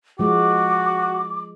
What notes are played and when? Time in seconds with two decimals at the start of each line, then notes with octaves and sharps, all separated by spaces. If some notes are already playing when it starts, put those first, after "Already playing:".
0.19 F3 G#3 F#4 D6